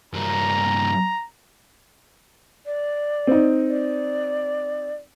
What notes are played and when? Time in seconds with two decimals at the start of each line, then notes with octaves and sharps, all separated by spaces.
0.14 G2 A#3 A#5
2.66 D5
3.27 C4 D#4
3.69 D5